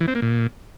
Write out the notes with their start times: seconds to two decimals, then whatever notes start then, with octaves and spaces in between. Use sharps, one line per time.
0.01 E3
0.08 C4
0.15 A#3
0.22 A#2